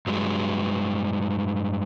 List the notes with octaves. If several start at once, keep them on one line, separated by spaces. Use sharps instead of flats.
G2 F#3 G#3